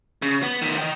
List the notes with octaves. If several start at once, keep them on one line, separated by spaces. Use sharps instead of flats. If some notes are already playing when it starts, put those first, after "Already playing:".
C#3
B3
D#3 B3
D#5 G5